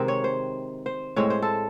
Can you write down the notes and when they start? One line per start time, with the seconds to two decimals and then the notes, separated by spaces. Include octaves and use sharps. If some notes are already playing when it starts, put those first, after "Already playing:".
Already playing: C3 D#3 G#3 C4
0.08 C#5
0.24 C5
0.86 C5
1.16 A2 G#3 C4 C#5
1.30 C5
1.42 A4